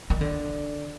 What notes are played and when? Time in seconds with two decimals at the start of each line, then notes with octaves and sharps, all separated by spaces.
0.10 D#3
0.21 D3